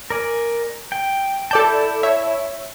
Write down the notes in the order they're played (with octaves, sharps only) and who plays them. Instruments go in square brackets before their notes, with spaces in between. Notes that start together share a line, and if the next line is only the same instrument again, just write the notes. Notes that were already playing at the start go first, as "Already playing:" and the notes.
[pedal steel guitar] A#4 D5 G#5
G5
[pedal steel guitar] E4 A5 [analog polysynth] A4 D5 G6
[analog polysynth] C#5 E5